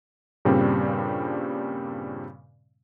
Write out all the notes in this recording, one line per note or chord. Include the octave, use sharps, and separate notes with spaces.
G2 A#2 C#3 G3 C4